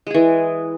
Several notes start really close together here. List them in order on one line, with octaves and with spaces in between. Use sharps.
G#3 G#4 E3